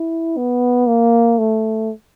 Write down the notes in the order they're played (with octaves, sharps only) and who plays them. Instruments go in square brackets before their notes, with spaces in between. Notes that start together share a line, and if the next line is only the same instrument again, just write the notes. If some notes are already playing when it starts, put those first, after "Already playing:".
Already playing: [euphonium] E4
B3
A#3
A3